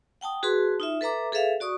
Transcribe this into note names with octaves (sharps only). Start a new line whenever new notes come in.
F#5 G5 A5 D#6
F#4 G#4 B4 A5 C6
D#4 F4 E5
A4 B4 E5 A#5 D6
G#4 A4 B4 E5 F5
F#4 D5 C#6 D#6